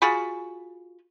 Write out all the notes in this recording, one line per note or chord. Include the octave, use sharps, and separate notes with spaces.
F4 F#4 G#4 B5